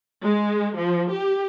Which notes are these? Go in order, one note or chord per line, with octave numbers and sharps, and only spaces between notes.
G#3
F3
G4